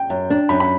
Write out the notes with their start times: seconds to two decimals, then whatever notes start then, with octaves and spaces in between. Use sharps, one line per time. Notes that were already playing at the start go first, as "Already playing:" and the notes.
Already playing: G5
0.10 F#2
0.30 D4
0.49 F#2 B5
0.60 B5